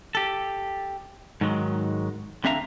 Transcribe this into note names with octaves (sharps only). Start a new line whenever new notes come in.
G4 A4
G#2 D#3 F#3 G#3
D3 C4 D4 E5 F5 A#5